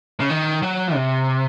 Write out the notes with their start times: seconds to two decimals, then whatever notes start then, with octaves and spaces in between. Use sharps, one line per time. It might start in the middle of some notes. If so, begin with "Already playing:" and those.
0.20 C#3
0.30 D#3
0.62 F#3
0.94 C3